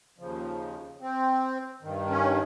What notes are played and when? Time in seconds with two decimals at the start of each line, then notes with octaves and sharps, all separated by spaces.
0.18 D#2 C#3 F3
1.01 C4
1.82 G2 D#3
2.09 C#4